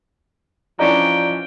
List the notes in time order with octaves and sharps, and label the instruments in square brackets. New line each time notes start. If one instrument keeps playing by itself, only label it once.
[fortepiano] E3 C#4 D4 [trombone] F3 [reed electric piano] D5 D#5 A#5 [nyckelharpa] G5